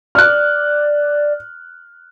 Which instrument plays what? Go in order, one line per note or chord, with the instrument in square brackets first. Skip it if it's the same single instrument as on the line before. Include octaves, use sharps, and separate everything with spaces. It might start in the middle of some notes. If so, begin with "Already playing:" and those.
[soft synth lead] D5 [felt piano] F6 F#6